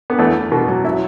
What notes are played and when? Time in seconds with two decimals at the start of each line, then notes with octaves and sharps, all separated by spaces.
0.10 B3
0.19 E2 A3
0.35 E2
0.52 B2
0.68 F#3
0.84 F#3 E4